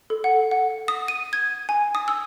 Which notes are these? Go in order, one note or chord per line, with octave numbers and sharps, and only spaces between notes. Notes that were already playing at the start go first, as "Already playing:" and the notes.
A4
F#5
F#5
D#6
D#7
G#6
G#5
D#6
E6